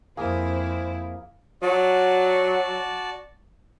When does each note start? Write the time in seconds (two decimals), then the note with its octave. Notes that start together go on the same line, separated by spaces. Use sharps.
0.17 F2 A#3 C4 E4 G#4
1.62 F#3 F#4 D5 A5